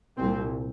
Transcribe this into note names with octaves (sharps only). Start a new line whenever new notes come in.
C2 A#2 C4